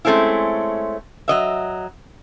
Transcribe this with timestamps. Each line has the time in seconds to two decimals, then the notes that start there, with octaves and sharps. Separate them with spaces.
0.05 G#3 A3 C4 C#4 E4
1.28 F#3 D#5 E5